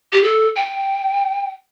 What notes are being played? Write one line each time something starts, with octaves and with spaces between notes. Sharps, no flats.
G4
A4
G5